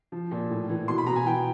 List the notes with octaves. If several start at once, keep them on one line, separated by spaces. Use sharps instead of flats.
F3
A#2
A2
E3
B2 C6
B5
B2 A#5
G#5
E3 G5